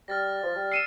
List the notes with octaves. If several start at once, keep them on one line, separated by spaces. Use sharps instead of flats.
G3 F6 A6 A#6
F3
G3
E6 C7 C#7 D#7 E7